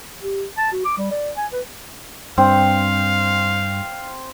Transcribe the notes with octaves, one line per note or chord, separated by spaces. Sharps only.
G4
A5
F#4
D6
G3
D5
G#5
B4
G2 C4 F5